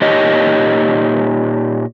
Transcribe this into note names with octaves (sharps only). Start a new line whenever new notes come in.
A#2 D#4 G4 C#5 D#5